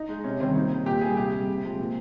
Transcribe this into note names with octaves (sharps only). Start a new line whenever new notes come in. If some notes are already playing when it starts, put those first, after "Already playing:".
Already playing: D#4
G#3
C3 C#4
D#3 G3 C4
A#2 D#4
G3
A#2 G4
G3 G#4
C3 G4
G3
C3
F3 G#3
A#2